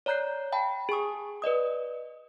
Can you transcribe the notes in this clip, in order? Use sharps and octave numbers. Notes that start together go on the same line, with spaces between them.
C#5 D5 A#5 F#6 G6 C7
F5 G5 A5 B5
G#4 G#5 C#6 D#6
B4 D5 D#5 D#6